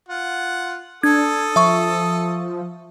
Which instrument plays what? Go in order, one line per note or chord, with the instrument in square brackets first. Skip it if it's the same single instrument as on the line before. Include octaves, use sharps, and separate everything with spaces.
[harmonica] F4 F#5
[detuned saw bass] D4 [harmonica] A4 D#6 [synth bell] G#6
[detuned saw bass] F3 [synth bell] E5 C#6